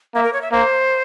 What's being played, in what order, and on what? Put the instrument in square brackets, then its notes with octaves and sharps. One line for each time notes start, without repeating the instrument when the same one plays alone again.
[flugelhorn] A#3 [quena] E5
[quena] A#4
C#5
E5
[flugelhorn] A#3 [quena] C5